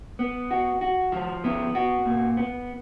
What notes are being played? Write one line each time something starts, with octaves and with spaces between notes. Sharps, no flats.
B3
F#4
F#4
F3
B3
F#4
A#2
B3